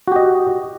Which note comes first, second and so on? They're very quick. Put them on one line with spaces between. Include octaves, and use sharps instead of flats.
F#4 G4 D#5